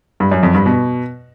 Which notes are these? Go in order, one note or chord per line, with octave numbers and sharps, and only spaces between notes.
G2
F#2
F2
G2
B2